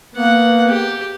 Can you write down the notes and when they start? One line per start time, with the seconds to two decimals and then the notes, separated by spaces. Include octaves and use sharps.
0.15 A#3 B3 F#5
0.68 G4